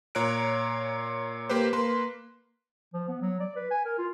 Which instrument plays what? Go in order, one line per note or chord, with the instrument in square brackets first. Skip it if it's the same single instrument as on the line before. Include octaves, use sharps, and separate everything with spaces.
[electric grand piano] A#2 C#5 A#5 F#6 D7
A#3 G4 B4 C5
A#3 B4 C6
[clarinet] F3
B3
F#3
D5
B4
G#5
A#4
F4